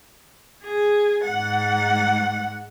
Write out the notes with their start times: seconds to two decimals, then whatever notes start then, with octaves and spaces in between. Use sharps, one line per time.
0.64 G#4
1.26 G#2 F#5